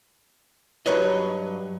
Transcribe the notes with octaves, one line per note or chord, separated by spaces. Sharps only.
G2 F#3 B4 C#5 D#5